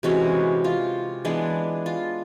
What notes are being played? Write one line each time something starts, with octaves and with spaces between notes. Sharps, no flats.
C3 E3 G#3 C#4 F#4
F4
E3 G#3 B3 D4
F4